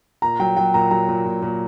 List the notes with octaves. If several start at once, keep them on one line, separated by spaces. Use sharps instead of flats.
A#2 A#5
F#3 G5
F#3 G5
A#2 A#5
F#3 A#5
A#2
A#2
A#2